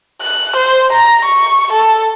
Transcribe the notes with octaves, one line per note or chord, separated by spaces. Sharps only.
F#6
C5
A#5
C#6
A4